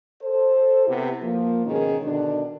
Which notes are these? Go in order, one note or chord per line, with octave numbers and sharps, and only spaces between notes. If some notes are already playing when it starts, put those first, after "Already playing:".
A4 C5
C3 B3 E4 G4 A4
F3 A#3
G#2 B2 D#3 C#4 G#4
B2 D3 D#3 D4